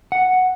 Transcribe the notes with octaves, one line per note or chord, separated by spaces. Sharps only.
F#5